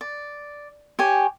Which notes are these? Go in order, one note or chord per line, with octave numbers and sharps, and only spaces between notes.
D5
G4 C#5 G#5